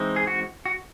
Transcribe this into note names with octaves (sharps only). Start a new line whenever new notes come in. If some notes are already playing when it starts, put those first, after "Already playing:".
Already playing: E3 G#3 C4 D#4
G#4
F#4
F#4